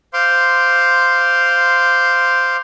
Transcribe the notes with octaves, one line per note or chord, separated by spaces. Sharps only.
C5 F5 C6 D6